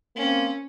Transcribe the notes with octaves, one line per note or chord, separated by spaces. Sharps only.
A#3 C4 C#4